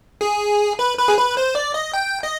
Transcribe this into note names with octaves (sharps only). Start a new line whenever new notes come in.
G#4
B4
B4
G#4
B4
C5
D5
D#5
G5
D#5